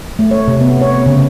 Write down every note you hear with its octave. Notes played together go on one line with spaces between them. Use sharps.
A3
C#5
C3
B3
C#5
C#3